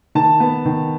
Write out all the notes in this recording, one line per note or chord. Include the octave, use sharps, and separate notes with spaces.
D#3 A5
B3
D#3